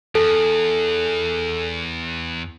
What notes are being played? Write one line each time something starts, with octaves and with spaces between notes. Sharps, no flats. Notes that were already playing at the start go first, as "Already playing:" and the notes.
E2 A4